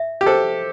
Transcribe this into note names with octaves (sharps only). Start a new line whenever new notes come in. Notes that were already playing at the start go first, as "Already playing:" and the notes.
Already playing: E5
G4
A4 C5